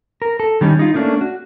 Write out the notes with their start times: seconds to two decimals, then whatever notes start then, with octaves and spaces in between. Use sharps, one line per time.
0.22 A#4
0.40 A4
0.61 D#3 G3 C#4 D#4
0.79 D#4 F4
0.94 A3 A#3 C#4 D4
1.21 F#4